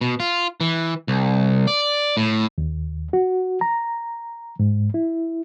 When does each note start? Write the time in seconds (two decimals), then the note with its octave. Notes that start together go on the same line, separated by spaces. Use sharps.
0.01 B2
0.20 F4
0.61 E3
1.08 C2
1.67 D5
2.17 A2
2.58 D#2
3.13 F#4
3.61 A#5
4.59 G#2
4.94 E4